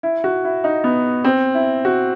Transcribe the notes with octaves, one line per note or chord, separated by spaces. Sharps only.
E4
F#4
E4
D#4
B3
C4
E4
F#4